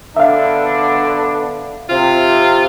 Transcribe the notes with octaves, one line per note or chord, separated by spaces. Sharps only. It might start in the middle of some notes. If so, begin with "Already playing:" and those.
D3 B3 D4 E5 F5
C3 F4